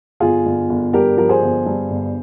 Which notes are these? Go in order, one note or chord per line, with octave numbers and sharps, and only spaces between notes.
G1 F4 G#4
G1
G1
G2 G4 A#4
F3 A#4
G#4 C5
G1
G2
G1